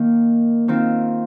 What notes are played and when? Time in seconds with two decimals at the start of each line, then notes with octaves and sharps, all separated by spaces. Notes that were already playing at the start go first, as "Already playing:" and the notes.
Already playing: D#3 A#3
0.68 D#3 C4 F4